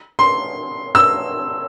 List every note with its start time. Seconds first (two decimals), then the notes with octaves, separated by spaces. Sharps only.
0.19 C6
0.95 E6